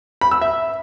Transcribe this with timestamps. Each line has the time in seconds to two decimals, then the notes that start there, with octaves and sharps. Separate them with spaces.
0.21 B5
0.31 E6
0.41 E5